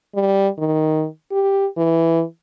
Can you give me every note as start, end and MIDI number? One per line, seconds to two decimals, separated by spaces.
0.15 0.48 55
0.58 1.05 51
1.31 1.67 67
1.77 2.23 52